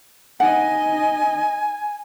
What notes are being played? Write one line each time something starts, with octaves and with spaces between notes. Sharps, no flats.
D#4 D#5 F#5 G#5